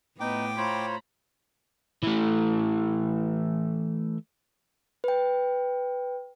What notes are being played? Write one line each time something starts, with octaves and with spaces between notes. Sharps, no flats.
A2 B3 D#4 G5 D6
F4 C5 C#5 A#5 B5
E3 A3
B4 G5